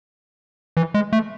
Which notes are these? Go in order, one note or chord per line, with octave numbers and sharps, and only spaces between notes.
E3
G#3
A3